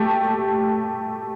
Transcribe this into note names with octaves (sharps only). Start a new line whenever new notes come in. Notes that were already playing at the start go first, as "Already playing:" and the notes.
Already playing: A3 G4